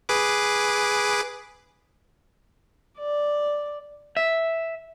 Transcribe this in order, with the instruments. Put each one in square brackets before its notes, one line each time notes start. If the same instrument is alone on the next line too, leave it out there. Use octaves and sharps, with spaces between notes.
[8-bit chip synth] G#4 B4 D6
[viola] D5
[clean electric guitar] E5